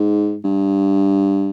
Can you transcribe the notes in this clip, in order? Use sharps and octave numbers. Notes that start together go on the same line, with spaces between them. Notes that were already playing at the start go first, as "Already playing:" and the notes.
Already playing: G#2
G2